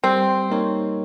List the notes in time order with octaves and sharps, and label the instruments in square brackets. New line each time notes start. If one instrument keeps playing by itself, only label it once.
[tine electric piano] G3 [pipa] C4
[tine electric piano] A#3 D#4 A#4 C#5